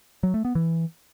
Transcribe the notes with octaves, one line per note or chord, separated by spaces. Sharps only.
F#3
A3
B3
E3